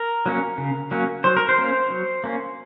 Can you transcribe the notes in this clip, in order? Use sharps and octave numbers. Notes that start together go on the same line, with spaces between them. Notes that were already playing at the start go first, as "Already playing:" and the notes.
Already playing: A#4
F#3 A#3 C#4
C#3
F#3 A#3 C#4
F#3 C5
A#4
C5
A#3 C#4
F#3
A#3 C#4